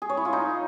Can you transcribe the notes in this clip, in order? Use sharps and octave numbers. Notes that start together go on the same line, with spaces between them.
G#4
C#5
E4
F4
D#4